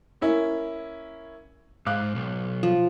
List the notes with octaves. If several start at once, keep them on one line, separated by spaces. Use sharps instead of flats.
A#3 C#4 E4
G#2 F5 D6 F#6
B1
F3